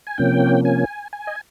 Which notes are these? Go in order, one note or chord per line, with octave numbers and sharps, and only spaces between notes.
G#5
C3 F3 A#3 C#4 G5
G#5
G#5
D#5